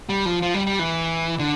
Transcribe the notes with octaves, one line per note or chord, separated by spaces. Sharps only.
G3
F3
F3
G3
G3
E3
D3